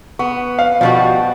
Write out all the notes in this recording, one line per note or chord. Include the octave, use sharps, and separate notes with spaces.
B3 C#6
F5
B2 F3 G3 F#4